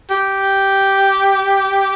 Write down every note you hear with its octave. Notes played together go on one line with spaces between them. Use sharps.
G4